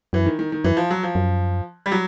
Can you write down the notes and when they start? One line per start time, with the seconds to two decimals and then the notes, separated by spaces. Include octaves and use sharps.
0.13 F#2 E3
0.26 D#3
0.39 D#3
0.52 D#3
0.64 F#2 E3
0.77 F3
0.91 F#3
1.03 F3
1.15 F#2
1.86 G3
1.92 F#3